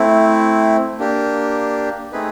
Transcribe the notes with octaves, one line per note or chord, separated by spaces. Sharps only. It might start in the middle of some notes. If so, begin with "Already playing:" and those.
Already playing: A3 C4 E4
A#3 D4 G4
A3 C4 D#4 G#4 B4